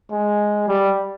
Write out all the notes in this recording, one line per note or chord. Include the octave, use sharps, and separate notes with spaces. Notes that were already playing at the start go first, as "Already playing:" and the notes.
G#3
G3